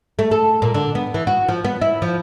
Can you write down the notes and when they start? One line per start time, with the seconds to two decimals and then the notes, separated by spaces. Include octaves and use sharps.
0.19 A3
0.31 A4
0.62 A#2
0.74 D3
0.95 B3
1.14 E3
1.27 F#4
1.48 F3
1.64 B3
1.81 E4
2.02 F3